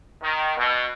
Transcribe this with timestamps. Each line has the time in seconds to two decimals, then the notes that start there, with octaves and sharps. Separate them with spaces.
0.22 D#3
0.57 B2